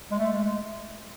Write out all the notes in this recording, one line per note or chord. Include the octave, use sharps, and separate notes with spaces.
G#3
A3
G#3